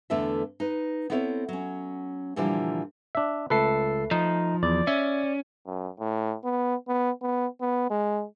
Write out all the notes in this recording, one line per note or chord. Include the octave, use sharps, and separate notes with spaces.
E2 D3 A3 B3 A4 E5
D#4 B4
B3 C4 E4 A4 C5 C#5
F#3 C#4
A#2 D3 E3 F3 G3 A#3
D4 E5
C#2 A3 A4 B4 C7
F3 D#4
E2 D5
C#4 E5
F#2
A2
B3
B3
B3
B3
G#3